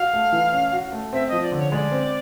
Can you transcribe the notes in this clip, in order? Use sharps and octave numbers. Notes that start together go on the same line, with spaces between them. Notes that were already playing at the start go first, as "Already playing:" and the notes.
Already playing: F#4 F5
A3
E3
C#4
F#4
A3
C4 E5
F3 D#5
D5
D3
C#5
G#3 D5
C4